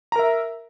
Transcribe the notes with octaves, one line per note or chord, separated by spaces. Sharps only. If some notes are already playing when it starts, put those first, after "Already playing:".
A#4 E5 A#5